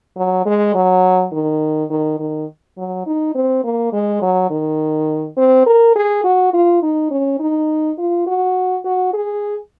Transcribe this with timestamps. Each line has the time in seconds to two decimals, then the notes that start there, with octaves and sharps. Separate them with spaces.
0.17 F#3
0.46 G#3
0.75 F#3
1.32 D#3
1.90 D#3
2.19 D#3
2.77 F#3
3.06 D#4
3.35 C4
3.64 A#3
3.93 G#3
4.22 F#3
4.50 D#3
5.37 C4
5.67 A#4
5.95 G#4
6.24 F#4
6.53 F4
6.82 D#4
7.11 C#4
7.40 D#4
7.98 F4
8.26 F#4
8.85 F#4
9.14 G#4